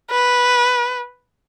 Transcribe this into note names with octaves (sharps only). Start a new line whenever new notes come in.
B4